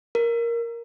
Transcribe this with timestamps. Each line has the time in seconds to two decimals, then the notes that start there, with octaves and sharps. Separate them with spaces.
0.15 A#4